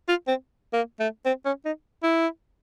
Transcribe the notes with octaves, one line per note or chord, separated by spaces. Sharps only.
F4
C4
A#3
A3
C4
C#4
D#4
E4